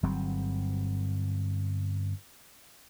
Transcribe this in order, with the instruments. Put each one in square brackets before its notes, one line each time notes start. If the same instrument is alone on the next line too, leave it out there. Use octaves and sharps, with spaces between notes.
[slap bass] G1 F#3 G3 C4